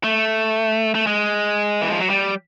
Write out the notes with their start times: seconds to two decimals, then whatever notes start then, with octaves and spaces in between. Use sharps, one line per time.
0.04 A3
0.95 A3
1.07 G#3
1.81 E3
1.90 F3
2.00 F#3
2.10 G3